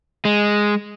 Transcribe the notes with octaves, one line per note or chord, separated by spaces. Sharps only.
G#3